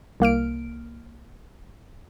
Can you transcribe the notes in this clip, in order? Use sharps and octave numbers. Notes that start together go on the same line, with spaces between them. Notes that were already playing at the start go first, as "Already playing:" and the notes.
C2 A#3 F6 D7